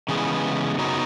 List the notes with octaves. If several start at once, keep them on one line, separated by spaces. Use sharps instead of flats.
C#3 E3 G#3 B3
F#2 C#3 F#3 B3 D#4